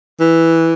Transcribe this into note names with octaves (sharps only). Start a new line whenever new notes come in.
E3